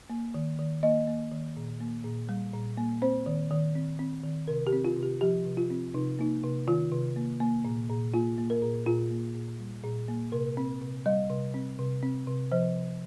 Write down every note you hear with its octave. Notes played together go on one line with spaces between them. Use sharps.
A#3
D#3
D#3
A#3 D#5
A#3
D#3
A#2
A#3
A#2
G3
A#2
A#3
C4 C5
D#3
D#3
C4
C4
D#3
C3 A#4
G4
C4
F4
C3
G4
F3 G4
C3
F4
C4
C3 D#4
A#3 D#4
C3
D#3 F4
C3
A#3
A#3
A#2
A#2
A#3 F4
A#3
A#4
A#2
A#2 F4
A#3
A#2
G3
A#2
A#3
C3 A#4
C4
C3
G3 D#5
C3
C4
C3
C4
C3
F3 C5
C3